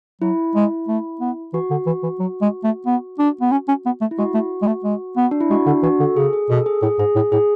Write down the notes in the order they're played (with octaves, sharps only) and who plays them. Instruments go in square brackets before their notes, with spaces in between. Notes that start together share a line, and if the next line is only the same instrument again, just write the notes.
[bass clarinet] F#3 [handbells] E4
[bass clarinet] G#3
A3
B3
[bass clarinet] E3 [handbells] F#4
[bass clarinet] D3
E3
E3
F#3
G#3
A3
B3
D4
B3
C#4
C#4
B3
A3
[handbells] E4
[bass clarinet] G#3 [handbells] F#4
[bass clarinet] A3
G#3
A3
G#3
B3
[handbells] D4
E4
[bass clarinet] G#3 [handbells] F#4
[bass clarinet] D3 [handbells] D4
[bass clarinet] E3 [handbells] F#4
[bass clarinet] D3 [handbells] A4
[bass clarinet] C#3 [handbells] G#4
[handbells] G#4
[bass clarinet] B2 [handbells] A4
[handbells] G#4
[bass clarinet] A2 [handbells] G#4
[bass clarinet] G#2 [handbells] G#4
[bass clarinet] A2
[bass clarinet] A2 [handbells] G#4